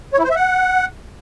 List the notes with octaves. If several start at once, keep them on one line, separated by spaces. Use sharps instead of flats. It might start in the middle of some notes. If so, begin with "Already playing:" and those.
C#5
E4
C5
E5
F#5